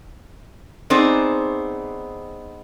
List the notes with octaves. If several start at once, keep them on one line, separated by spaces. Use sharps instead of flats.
B3 C4 D#4 G#4 C5 D5